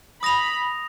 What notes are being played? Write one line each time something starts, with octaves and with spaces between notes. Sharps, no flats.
B5 D#6 A#6 F7